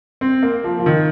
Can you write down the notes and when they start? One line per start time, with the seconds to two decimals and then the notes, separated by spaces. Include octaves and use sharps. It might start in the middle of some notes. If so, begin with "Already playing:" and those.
0.21 C4
0.43 A#3
0.64 F3
0.79 F3
0.86 D#3